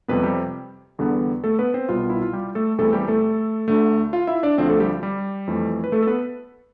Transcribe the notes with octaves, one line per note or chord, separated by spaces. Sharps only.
F2 C3 G3 B3 B4
G3 G4
E2 D3 G3 B3
A3 A4
B3 B4
C4 C5
C2 B2 G3 B3 F4
E4
F4
G3 G4
A3 A4
E2 C3 E3 G3 A3 A4
G3 G4
A3 A4
D2 D3 A3
F4 F5
E4 E5
D4 D5
D2 D3 F3 C4 C5
A3 A4
G3 G4
G3 G4
F2 E3 A3
B4
A3 A4
A4
B3 B4